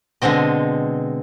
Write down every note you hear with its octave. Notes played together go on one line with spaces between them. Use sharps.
B2 D3 G#3 C4 D#5